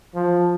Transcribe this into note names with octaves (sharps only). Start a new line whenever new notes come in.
F3